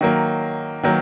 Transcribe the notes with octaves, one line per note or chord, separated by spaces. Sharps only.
D#3 F#3 A#3
D#3 F#3 A#3